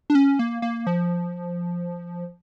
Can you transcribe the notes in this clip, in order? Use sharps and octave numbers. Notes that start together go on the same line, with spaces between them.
D4
C#4
A#3
A#3
F3